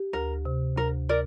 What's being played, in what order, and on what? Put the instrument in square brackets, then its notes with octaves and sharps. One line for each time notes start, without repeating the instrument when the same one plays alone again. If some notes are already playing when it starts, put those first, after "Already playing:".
Already playing: [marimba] G4
[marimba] D2 [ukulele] A#4
[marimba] C3
[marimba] D2 [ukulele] A#4
[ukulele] A#4 D5